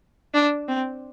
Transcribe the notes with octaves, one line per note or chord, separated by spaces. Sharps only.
D4
C4